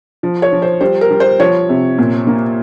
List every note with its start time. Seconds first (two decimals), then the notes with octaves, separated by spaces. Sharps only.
0.23 F3
0.42 C#5
0.53 F3
0.62 C5
0.81 G3 C5
1.01 A#4
1.11 G3
1.20 C5
1.40 F3 C#5
1.69 C3
1.98 A#2
2.27 A#3